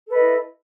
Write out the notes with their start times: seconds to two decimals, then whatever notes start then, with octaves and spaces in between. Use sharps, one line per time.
0.07 A4
0.11 B4
0.15 D#5
0.19 E4